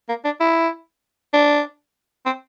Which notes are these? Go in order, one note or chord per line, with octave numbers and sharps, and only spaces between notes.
A#3
D4
E4
D4
C4